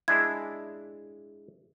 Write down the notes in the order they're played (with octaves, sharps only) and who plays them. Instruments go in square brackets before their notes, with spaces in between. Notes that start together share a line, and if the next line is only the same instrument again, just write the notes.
[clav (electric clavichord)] G#3 D4 E4 [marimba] G#6